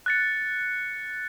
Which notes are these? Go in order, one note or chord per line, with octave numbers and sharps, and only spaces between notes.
F#6 A6 C#7